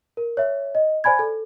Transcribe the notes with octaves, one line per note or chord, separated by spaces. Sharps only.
A#4
C#5 E5
D#5
C5 D5 G#5 B5 G#6
A4